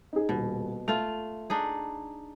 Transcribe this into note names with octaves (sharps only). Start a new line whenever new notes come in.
D#4 G#4
D#1 B2
A3 F4 F7
D4 D#4 G#4